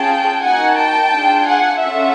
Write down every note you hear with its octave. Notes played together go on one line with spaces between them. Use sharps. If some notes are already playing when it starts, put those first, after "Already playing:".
Already playing: C#4 F4 G#4 G5 A5
A#3 D#4 F#4 F#5 G#5
G5 A5
D4 F4 G#4
F#5 G#5
C#4 F4 A4 E5 F#5